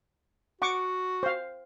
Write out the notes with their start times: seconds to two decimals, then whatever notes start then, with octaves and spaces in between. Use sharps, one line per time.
0.62 F#4 F#5 C#6 D6
1.23 C5 F5